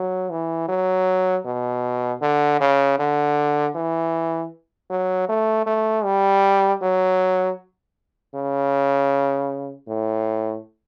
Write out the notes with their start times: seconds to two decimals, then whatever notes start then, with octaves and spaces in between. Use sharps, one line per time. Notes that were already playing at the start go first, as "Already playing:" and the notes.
Already playing: F#3
0.30 E3
0.68 F#3
1.46 B2
2.22 D3
2.60 C#3
2.99 D3
3.75 E3
4.90 F#3
5.29 A3
5.66 A3
6.04 G3
6.82 F#3
8.35 C#3
9.88 A2